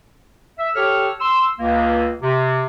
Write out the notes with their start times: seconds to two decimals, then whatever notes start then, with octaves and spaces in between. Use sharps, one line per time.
0.59 E5
0.75 G4 A4 C#5 F6
1.20 C6 E6
1.60 C#2 A#3
2.22 C3